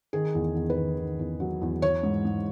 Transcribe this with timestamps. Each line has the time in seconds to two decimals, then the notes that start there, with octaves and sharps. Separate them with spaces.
0.13 D#3 G#4
0.35 E2
0.55 E2
0.70 B4
0.77 D#3
0.98 D#3
1.19 E2
1.40 F#3
1.61 E2
1.82 E3 C#5
2.03 G#2
2.25 G#2